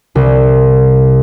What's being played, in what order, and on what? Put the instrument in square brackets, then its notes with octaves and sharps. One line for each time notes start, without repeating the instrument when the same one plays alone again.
[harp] C2